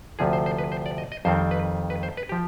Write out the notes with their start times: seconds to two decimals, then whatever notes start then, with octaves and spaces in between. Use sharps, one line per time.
0.19 D2 C3 F3 G#4
0.33 C5
0.46 C5
0.58 B4
0.72 C5
0.86 D5
0.98 D#5
1.12 D#5
1.25 F2 D#3 G3 C4 C5
1.51 B4
1.90 B4
2.03 C5
2.17 B4
2.29 F3 G4